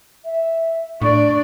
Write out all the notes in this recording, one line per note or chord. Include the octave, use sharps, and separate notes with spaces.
E5
A2 D4 D5 C#6